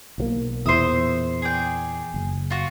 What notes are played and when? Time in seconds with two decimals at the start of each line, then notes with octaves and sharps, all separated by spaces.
0.18 B1 F3 A#3
0.66 E2 A#2 C5 E5 D#6
1.42 G#4 D5 G5
2.14 F#1
2.50 F4 F#4